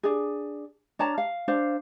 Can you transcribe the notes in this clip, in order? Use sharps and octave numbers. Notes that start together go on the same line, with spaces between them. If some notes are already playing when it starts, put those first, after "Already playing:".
D4 G#4
D4 C#5 A5 A#5
F5
D4 C5 F5